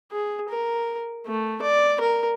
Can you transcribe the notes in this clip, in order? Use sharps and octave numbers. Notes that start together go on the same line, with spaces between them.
G#4
A#4
A3
D5
A#4